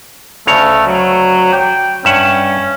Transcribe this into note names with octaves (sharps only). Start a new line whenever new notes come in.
D2 C#3 A3 C#5
F#3
G5
G2 C#4 E5 F#5